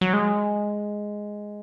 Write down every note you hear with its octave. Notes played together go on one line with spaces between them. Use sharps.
F#3
G#3